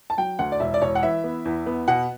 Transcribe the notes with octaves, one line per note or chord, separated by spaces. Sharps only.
A5
F#3 G5
D2 F#5
D5
E1 E5
D5
E1 C#5
F#5
E3 E5
B3
E2
B3
B2 F#5